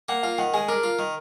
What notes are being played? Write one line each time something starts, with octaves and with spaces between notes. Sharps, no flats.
A#3 F#5
F4 F5
D#3 F#5
G#3 G#5
D4 A#4
F4
D#3